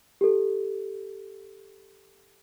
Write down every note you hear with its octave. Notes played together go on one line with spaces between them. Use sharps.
G4 A4